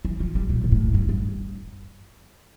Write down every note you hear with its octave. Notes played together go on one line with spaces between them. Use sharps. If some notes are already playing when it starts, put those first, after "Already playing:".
E3
F3
G3
A#2
A#2
A2
G2
G2